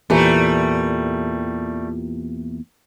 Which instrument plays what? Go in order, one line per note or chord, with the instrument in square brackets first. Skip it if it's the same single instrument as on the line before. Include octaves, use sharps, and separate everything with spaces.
[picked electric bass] E2 A#2 [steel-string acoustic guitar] E3 G4 A#5 [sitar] G3 A3